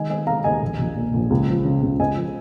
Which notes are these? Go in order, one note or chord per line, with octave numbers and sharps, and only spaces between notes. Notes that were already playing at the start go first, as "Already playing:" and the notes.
Already playing: D#3 G#3 D#5 G#5
G#3 D#5 G#5
G#3 F5 A#5
D#2 D#5 G#5
A#1
A#1
A#2
A#1
C#2
F3
C#3
C#2
C#2 D#5 G#5
F3